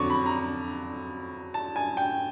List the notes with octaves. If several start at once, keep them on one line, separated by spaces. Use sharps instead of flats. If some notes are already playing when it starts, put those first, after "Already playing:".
Already playing: F2 D3 F#3 C#6 D6
B5
A#5
A5
G#5
G5